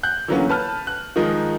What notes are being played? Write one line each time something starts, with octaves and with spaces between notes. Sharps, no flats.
F#6 G6
D3 E3 F#3 A#3 B3 C#4
B4 A5 F6
F#6
D#3 F3 G#3 D#4 A#4